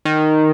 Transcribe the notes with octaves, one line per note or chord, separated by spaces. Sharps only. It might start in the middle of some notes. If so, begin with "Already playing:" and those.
D#3